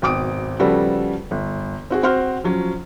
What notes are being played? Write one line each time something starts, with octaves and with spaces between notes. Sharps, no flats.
G#1 B2 G5 D6 D#6 D7
C#3 F3 G3 B3 F#4 A4
G1
C4 F#4 G#4
C4 F#4 C5 F6
F3 F#3 C#4